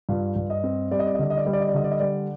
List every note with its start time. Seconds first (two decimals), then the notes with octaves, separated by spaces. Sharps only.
0.09 G2 F4
0.36 G2
0.50 D#5
0.63 C4
0.91 G3 D5
0.99 D#5
1.07 D5
1.14 D#5
1.19 D3 D5
1.30 D#5
1.37 D5
1.45 G3 D#5
1.53 D5
1.61 D#5
1.69 D5
1.74 D3 D#5
1.84 D5
1.91 D#5
2.00 G3 D5